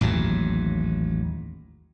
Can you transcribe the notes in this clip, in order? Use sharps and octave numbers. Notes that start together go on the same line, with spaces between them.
A1 D#2 G#2 F#3